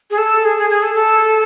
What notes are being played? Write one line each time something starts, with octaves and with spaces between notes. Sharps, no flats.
G#4
A4
G#4
G#4
G#4
A4
A4